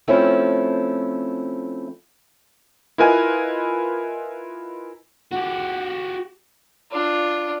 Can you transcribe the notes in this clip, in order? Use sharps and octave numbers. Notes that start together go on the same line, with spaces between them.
F3 A3 C4 C#4 E4
E4 F4 A#4 B4 D#5 G#5
F#4 G4
D4 F4